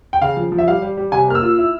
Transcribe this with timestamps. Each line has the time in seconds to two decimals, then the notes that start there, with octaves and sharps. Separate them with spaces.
0.13 G5
0.22 C#3 F5
0.37 F3
0.52 F3
0.58 E5
0.67 G3 F5
0.82 G3
0.97 G3
1.12 C3 G#5
1.28 A#3 F6
1.35 E6
1.42 F4
1.58 E4